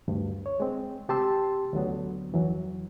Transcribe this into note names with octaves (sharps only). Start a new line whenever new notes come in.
D2 G2
C#5
G#3 C4
C3 G4 A5 C6 E6
D2 D3 F#3 B3
F2 E3 F#3